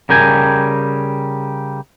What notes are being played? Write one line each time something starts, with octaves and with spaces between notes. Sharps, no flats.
C#3 G3 A#4 G5 G#5